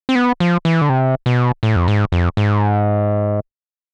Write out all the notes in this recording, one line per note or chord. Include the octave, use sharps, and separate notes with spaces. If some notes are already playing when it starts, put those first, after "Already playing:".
C4
B3
F3
E3
D3
C3
B2
A2
F2
G#2
F2
G#2